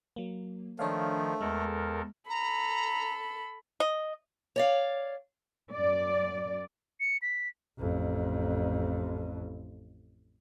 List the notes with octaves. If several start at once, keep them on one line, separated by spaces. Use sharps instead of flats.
F#3 A#3
D#3 F3 A3 D4 C#5 F5
E2 G#3 A4 A#4
A4 A#5 B5
D#5
C#5 D5 F5
F#2 D5
C#7
B6
A1 F2